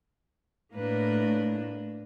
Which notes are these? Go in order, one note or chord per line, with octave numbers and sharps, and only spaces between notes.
A2 A#3 D4 B4